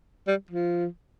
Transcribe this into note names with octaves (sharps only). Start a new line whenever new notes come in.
G3
F3